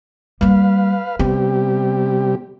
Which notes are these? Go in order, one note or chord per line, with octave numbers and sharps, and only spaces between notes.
G3 A#3 B4 F5
C3 G3 B3 G4